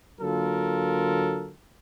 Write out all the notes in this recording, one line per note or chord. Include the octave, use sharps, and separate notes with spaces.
D3 F#3 A#3 F4 A4 A#4